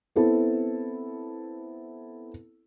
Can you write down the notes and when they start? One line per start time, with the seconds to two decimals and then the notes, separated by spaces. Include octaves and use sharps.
0.16 B3 C4 E4 A4